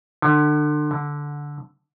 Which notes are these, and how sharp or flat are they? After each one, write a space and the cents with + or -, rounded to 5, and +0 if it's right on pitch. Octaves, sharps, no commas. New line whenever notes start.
D3 +30
D3 -10